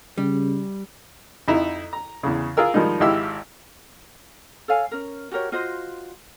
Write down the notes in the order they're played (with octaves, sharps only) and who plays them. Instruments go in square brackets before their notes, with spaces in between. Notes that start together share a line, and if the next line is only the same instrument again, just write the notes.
[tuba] C#3 [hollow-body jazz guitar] G3
[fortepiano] F2 D#4 E4 A#5
A#5
E2 C#3
F4 G#4 A#4 E6
D#3 F3 G3 G#3 D#4
G#1 G#3 E4 G4 F5 E6
[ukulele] A4 C#5 F5 G#5
C#4 A#4
F#4 G4 A#4 C#5
F4 F#4 C5 D#5